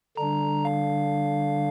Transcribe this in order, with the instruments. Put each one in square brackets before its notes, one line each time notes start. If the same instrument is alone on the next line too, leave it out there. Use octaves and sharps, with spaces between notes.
[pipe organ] D3 G3 D4 [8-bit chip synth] A#5
[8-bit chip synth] F5